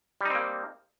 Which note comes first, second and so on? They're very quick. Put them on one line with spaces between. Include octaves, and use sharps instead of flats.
G3 D#4 C4 A#3